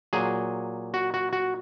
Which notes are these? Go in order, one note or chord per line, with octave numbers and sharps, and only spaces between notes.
A#2 F#3 G#4
F#4
F#4
F#4